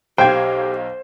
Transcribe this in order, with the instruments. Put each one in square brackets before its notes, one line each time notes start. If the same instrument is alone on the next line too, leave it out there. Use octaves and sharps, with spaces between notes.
[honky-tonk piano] B1 F5 G#6 [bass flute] G4 [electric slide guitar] C5 [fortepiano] G5